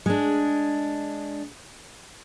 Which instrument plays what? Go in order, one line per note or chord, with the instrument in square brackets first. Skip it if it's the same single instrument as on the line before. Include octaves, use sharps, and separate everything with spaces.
[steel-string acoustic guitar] G#3 D4